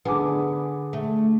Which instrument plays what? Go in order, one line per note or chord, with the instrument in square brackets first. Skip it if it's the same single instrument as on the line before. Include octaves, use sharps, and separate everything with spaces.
[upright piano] D3 G#4 D6 [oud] B3
[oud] A3